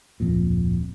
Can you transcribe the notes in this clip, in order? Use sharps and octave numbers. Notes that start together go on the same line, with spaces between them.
D1 F2 A#2